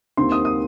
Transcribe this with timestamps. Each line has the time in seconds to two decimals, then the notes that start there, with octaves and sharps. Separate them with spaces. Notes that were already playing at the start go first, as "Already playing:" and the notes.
0.17 D#2 D#3 C4 C6
0.32 D#6
0.45 D#6